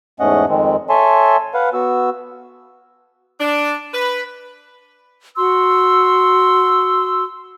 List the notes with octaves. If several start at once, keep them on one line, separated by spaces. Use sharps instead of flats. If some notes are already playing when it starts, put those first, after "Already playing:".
E2 G#2 A3 C#4 D#5 F#5
F2 D#3 G#3 C4
A4 C#5 E5 G#5 A5 C6
B4 F5 F#5
B3 F#4 E6
D4
B4
F#4 C6 E6